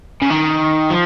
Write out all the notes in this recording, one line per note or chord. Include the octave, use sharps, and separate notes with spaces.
C#3
D#3
F3